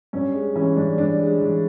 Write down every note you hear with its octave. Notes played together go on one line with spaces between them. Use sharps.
G2 C#4
G#3
E3 C#4
G2 D4
G2 D4
G#3
E3